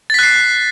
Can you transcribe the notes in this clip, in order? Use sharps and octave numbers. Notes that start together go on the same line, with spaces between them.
F#6 A6 B6 C7